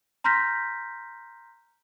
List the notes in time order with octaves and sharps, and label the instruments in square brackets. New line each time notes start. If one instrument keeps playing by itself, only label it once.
[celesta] A#5 C6 F6 G6 A#6 B6